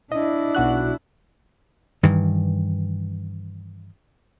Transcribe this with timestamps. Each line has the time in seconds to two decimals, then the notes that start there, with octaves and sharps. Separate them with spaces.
0.12 D4 E4 D#5
0.55 B1 F#4 F#6
2.03 G2 D#3 E3